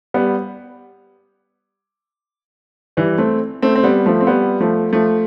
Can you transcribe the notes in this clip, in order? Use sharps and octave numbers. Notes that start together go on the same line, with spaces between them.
G3 B3
E3 G3
A3 C4
A3 C4
C4
G3 B3
F3 A3
C4
G3 B3
F3 A3
F3 A3